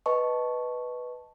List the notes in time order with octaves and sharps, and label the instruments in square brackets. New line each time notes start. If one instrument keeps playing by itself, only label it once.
[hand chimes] B4 D#5 A5 C#6